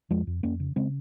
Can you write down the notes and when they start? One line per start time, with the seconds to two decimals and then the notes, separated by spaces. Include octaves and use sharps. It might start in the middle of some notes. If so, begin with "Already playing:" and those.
0.10 F2 F3 G#3
0.27 F2
0.43 F2 A#3 C#4
0.60 C#3
0.76 C#3 G#3 C4